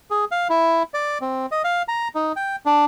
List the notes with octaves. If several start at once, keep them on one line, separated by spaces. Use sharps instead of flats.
G#4
F5
E4
D5
C4
D#5
F5
A#5
D#4
G5
D4